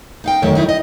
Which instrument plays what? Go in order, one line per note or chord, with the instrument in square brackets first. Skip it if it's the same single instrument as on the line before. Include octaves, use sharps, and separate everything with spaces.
[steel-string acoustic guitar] D#4 F5 G5
F2 D#3 F#3 A3 C#5
F#3 D#4 E4
D#5